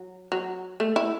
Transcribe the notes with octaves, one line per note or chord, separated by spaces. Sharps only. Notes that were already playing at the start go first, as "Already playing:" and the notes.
Already playing: F#3
F#3
A3
E4